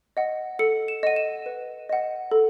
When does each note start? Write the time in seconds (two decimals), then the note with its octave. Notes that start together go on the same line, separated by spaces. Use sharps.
0.17 D#5 F#5
0.59 A4 C#7
0.88 E7
1.03 D#5 F#5 D#7
1.16 E7
1.46 B4
1.89 D#5 F#5
2.32 A4